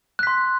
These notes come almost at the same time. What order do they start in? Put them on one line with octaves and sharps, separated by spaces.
F#6 B6 C6